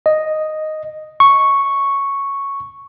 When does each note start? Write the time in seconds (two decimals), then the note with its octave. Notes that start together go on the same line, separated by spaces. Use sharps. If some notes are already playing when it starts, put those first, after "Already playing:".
0.06 D#5
1.20 C#6